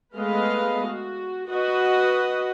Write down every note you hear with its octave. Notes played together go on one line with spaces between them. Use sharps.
G#3 A3 B3 B4 D#5 F5
F#4
F#4 B4 D#5 F#5